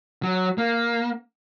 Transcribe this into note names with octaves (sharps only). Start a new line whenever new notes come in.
F#3
A#3